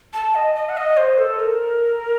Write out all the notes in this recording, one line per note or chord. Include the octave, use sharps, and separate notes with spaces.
A5
D#5
D#5
F#5
D#5
C5
A4
A#4